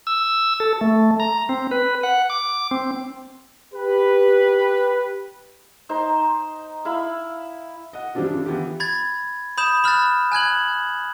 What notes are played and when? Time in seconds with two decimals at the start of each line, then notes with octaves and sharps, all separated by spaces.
0.07 E6
0.60 A4
0.81 A3
1.20 A#5
1.49 C4
1.71 B4
2.03 F#5
2.30 D6
2.71 C4
3.74 G4 B4
5.89 D#4 C5 A#5 C6
6.85 E4 E5 F5 B5
7.93 D#5 F#5
8.15 E3 G3 G#3 C4 D4 F4
8.29 C#3 D4 F4
8.46 E3 B3 F4 G4
8.80 B5 G#6 A6
9.58 B5 D#6 G6 E7
9.84 B5 F6 F#6 A6
10.32 G#5 F#6 G#6 F#7